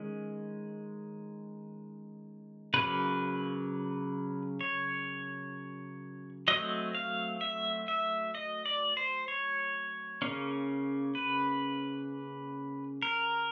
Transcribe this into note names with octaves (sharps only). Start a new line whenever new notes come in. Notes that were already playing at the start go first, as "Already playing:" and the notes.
Already playing: D#3 G#3 C#4
C#3 F#3 A#3 B4
C#5
F#3 A3 C4 D#5
F5
E5
E5
D#5
D5
C5
C#5
C#3 F#3 A#3 C#4
B4
A#4